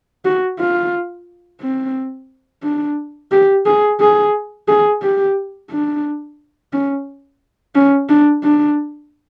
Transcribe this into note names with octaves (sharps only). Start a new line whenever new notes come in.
F#4
F4
C4
D4
G4
G#4
G#4
G#4
G4
D4
C#4
C#4
D4
D4